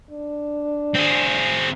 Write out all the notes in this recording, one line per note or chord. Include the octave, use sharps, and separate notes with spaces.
D4
C4 G#4